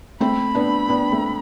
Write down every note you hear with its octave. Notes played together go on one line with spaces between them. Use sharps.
A3 C4 B5
B3 D4
B3 D4
A3 C4